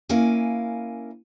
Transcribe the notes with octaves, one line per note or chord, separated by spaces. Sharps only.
A#3 C#4 E4 A#4 F5 G#5